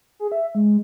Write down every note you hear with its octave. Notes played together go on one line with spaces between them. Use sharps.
G#4
E5
G#3